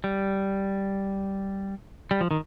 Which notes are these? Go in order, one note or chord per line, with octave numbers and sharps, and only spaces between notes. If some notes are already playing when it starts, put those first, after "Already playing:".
G3
G3
F3
D#3